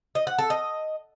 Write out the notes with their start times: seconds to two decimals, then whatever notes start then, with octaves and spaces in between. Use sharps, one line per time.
0.15 D#5
0.27 F#5
0.38 A4
0.50 D#5